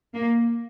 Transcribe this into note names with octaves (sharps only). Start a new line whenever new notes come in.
A#3